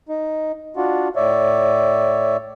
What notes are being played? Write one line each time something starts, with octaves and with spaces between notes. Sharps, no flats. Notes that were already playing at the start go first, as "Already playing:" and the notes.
D#4
D4 F4 F#4
A2 C#5 D5 E5